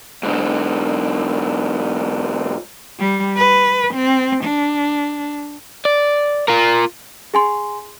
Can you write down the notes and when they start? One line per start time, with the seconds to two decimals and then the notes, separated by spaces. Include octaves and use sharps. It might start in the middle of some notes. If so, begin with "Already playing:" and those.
0.23 G#2 D3
3.00 G3
3.37 B4
3.94 C4
4.44 D4
5.85 D5
6.48 F4 A#4
7.34 G#4 G#5 C6